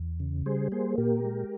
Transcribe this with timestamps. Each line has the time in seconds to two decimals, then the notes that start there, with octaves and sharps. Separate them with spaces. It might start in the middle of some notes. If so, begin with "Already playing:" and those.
Already playing: E2
0.20 C#3
0.46 G3 G#4 C5
0.72 A#3 G#4 C5
0.98 A#2 G4 A#4
1.25 G#3